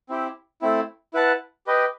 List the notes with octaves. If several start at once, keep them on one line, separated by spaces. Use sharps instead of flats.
C4 E4 G4
A3 C4 E4
E4 B4 F#5 A5
G4 B4 D#5 G5